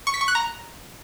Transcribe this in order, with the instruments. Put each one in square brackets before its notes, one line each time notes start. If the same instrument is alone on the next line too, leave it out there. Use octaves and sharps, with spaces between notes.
[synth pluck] C#6
B6
C#6
F#6
A#5